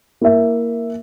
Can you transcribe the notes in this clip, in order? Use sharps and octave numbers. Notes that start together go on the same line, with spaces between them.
A#3 E4 A#4 E5